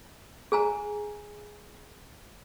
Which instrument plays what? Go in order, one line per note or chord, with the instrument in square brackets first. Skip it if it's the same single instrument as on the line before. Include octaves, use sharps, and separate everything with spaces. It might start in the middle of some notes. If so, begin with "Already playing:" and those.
[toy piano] G#4 G#5 A#5